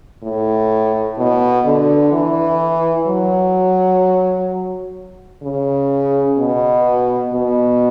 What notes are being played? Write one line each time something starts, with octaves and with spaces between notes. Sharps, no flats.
A2
B2
D3
E3
F#3
C#3
B2
B2